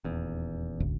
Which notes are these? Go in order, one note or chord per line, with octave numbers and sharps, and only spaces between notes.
D#1 E2
E1 A1 D2